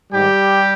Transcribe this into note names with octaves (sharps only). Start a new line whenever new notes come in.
G#2 D#3 G3 G4